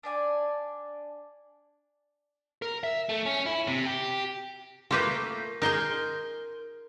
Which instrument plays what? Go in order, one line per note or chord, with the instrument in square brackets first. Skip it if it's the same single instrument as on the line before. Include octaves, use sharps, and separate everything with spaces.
[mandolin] D4 D5 G#5
[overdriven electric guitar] A#4
E5
A3
C#4
E4
C3
G4
[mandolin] A3 A#3 G6 [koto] F4 G4 B4
[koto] D#4 G#4 [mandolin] A#4 C6 G6